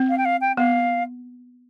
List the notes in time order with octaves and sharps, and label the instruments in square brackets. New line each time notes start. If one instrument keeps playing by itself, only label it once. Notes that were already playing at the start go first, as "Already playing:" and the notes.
Already playing: [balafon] C4
[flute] F5
G5
F5
G5
[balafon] B3 [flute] F5